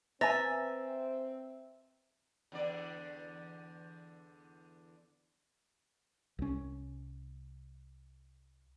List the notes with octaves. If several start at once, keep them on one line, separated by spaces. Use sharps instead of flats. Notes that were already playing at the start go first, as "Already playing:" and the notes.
C4 B4 E5 G#5 A#5 A6 A#6
E2 D3 D5
C2 C#4